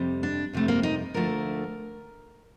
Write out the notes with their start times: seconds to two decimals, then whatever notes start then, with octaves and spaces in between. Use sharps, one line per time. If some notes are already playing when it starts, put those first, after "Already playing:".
Already playing: F2 C3 G3
0.23 D4
0.53 F2 C3 G3 A3
0.68 A#3
0.83 D#4
1.14 D2 D3 F3 A3 A#4